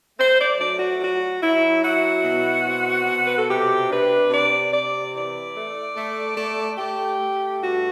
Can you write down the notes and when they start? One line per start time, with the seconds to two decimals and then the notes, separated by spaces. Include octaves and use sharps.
0.18 A3 C5
0.38 D5
0.58 F#3 D5
0.79 F#4
1.00 F#3 F#4
1.41 F#3 E4
1.83 E4 F#4
2.24 B2
2.65 C4
3.06 B2
3.23 B4
3.35 A4
3.48 C3 G4
3.88 D4 B4
4.30 C3 D5
4.71 C3 D5
5.12 E3 D5
5.54 A3
5.96 A3
6.37 A3
6.77 A3 G4
7.19 A3
7.60 G2 F#4